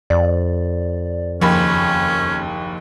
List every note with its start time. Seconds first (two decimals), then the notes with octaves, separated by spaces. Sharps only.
0.10 F2 D5
1.42 F#1 D#2 F3 C#4 B5